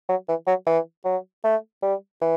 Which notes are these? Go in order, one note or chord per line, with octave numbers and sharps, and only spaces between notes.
F#3
E3
F#3
E3
F#3
A3
G3
E3